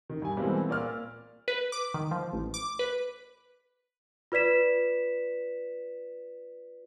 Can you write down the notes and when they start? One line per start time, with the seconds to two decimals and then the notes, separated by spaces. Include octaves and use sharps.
0.09 D#3
0.22 G2 G#5
0.37 B2 E3 G3 G#3 A#3 C4
0.69 A#2 A#3 D5 E6 F6
1.48 B4
1.72 D6
1.94 D#3
2.11 F3
2.33 A1
2.54 D6
2.79 B4
4.32 F4 B4 D5 B6 E7